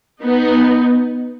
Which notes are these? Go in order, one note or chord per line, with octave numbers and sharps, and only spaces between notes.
B3 D#4